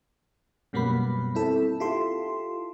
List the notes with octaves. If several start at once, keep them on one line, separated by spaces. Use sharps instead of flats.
F#2 B2 G3 A#3 B3 B5
C4 E4 A4
E4 F4 G4 A4 C6